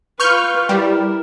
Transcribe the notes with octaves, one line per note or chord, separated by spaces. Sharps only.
F4 B4 C#6 F6 G6
G3 E4 A#4